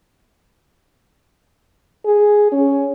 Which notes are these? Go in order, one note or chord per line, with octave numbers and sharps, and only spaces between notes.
G#4
C#4